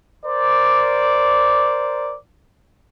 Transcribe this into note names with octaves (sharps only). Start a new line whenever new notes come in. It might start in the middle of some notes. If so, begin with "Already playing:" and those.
A#4 C5 D5